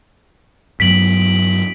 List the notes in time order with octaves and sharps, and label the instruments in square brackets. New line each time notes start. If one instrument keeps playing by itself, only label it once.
[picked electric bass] G2 F#3 B3 [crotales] B6 D7 F#7